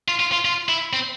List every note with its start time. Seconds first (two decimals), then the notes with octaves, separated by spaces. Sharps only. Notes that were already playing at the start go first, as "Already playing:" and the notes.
0.08 F4
0.20 F4
0.32 F4
0.45 F4
0.69 E4
0.93 C4